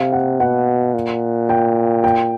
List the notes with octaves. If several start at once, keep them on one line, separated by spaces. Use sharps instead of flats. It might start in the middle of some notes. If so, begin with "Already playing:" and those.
Already playing: C3 F5
F#5
B2 F#5
A#2
G5
G5